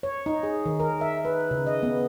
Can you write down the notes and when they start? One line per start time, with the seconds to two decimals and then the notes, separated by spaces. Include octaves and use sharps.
0.03 C#5
0.26 D#4
0.43 G#4
0.66 D#3
0.80 A#4
1.01 E5
1.25 B4
1.51 C#3
1.67 D#5
1.83 B3